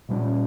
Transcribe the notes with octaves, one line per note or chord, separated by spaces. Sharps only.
A#2 G3 A#3 C#4